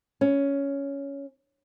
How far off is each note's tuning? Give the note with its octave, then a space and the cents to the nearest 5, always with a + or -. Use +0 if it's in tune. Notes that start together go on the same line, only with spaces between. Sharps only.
C#4 +10